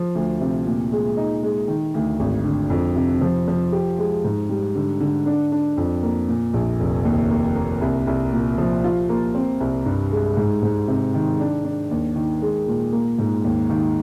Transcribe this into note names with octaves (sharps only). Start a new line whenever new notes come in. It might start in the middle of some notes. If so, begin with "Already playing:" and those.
Already playing: F3
D2
C3
A#2
G#3
D#4
G#3
D#3
D2
G#1
D3
F2
C3
F3
F3
G4
G#3
G#2
G3
D3
D3
D4
D4
F2
A#3
A#2
A#1
F1
D#2
A#3
A#3
C2
C2
A#2
F3
F4
A#3
C4
C2
G2
G#3
G#2
G#2
C3
D#3
D4
D4
D#2
D#3
G#3
A#2
A#3
G#2
D#2
D#3